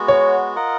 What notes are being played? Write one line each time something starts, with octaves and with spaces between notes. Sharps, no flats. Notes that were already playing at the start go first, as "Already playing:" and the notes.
Already playing: G#3 B3 F#4
C#5
F4 A#4 D#5 F#5